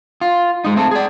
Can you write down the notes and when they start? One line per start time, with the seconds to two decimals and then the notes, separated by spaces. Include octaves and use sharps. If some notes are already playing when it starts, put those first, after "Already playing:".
0.21 F4
0.64 G#3 D#4
0.76 A3 C4 A4
0.91 G#4 D5